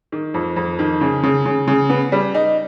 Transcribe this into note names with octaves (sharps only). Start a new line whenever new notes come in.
D#3
F2
F2
D#3
C#3
C#3
C#3
C#3
B3
G3
D#4